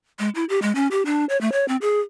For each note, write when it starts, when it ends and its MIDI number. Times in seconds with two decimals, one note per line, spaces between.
0.19 0.29 56
0.35 0.44 64
0.49 0.59 67
0.62 0.72 56
0.75 0.87 61
0.91 1.02 67
1.06 1.25 62
1.29 1.39 73
1.41 1.51 57
1.52 1.67 73
1.68 1.76 60
1.81 2.00 68